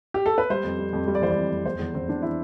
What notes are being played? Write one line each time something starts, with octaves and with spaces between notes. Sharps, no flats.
G4
A4
B4
G3 C5
F2
G3
F2
G3
D5
E3 C5
D5
F2
F2
E2 C5
E2
E2 C4
E2 D4
E3 E4